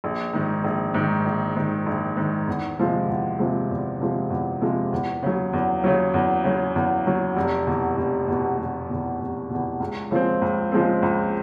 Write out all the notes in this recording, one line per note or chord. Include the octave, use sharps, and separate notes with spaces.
A#1
G#2 D#3
A#1
G#2 D#3
A#1
G#2 D#3
A#1
G#2 D#3
E2
C3 F3 G#3
E2
C3 F3 G#3
E2
C3 F3 G#3
E2
C3 F3 G#3
E2
C#3 F#3
E2
C#3 F#3
E2
C#3 F#3
E2
C#3 F#3
F1
E2 B2
F1
E2 B2
F1
E2 B2
F1
E2 B2
C#2
C#3 F3 G#3 C4
C#2
C#3 F3 G#3 C4
C#2